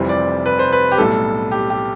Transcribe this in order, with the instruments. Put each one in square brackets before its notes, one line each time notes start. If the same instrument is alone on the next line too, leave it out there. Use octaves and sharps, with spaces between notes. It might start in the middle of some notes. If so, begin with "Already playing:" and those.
Already playing: [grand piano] F1 F2 C3 E3 G3
D5
B4
C5
B4
G4
B1 A2 G3 A4
G4
G4